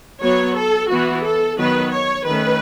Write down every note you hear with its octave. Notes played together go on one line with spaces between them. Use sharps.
F#3 B3 C#5
A4
E3 B3 F#4
A4
D#3 F#3 B3 B4
C#5
D#3 A3 C#4 B4